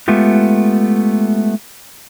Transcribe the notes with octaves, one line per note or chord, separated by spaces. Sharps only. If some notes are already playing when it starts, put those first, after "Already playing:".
G#3 A3 B3 F4 G4